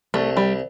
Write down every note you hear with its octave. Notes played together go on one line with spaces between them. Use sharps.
C2 A3
G3